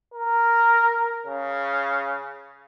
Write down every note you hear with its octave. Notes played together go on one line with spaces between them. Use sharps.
A#4
C#3